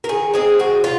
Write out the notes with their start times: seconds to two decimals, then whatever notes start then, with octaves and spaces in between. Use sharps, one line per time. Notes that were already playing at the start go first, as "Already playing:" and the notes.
0.04 A#4
0.09 D#3 G#4
0.34 G#3 C4 G#4
0.59 D#3 F#4
0.84 F4